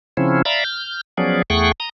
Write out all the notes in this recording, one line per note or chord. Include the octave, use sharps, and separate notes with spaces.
C#3 F3 C4 C#4 E4
D5 E5 F5 A#5 B5
F6 G6
F3 F#3 B3 C#4 G#4 D5
E2 A3 G#4 F#5 G5 C#6
A#5 D#6